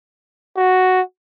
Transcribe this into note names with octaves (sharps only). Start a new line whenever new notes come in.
F#4